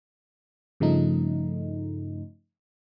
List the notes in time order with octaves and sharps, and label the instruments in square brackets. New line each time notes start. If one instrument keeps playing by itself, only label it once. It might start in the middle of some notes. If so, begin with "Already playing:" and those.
[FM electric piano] G2 C#3 F3 A3 D#4